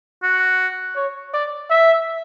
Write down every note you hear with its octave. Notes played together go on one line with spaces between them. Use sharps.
F#4
C#5
D5
E5